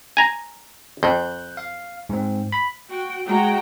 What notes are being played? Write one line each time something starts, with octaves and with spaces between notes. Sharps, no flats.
G#5 A#5
F2 F#6 G6
F5
G#2 C4
B5
F#4 G5
G#3 F#4 G5 A#5